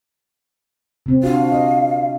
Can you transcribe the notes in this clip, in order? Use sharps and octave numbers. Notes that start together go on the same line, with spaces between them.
C3 C4
D4 F4 F#4 F5
D#5